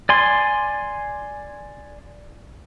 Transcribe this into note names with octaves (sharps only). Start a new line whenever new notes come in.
D5 G#5 C6